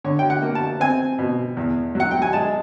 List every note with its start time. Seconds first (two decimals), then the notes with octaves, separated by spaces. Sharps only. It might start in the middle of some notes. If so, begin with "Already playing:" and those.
0.04 D3 C#5
0.19 G5
0.30 F#5
0.42 A#3
0.55 A5
0.80 C4 G#5
1.19 B2
1.57 E2
1.95 F#3 F#5
2.11 G5
2.22 G#5
2.33 G#3 A5